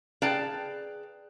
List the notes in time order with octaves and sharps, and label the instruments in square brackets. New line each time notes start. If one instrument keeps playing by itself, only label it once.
[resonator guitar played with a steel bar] G#4 B4 D5 F5 G5 A5